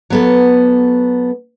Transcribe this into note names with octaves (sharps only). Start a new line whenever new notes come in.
F#3 B3 A4